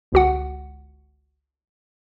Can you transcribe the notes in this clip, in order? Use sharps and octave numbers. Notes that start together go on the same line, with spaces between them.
G1 C#2 F#4 F#5